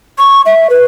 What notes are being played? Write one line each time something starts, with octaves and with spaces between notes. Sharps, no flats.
C#6
E5
B4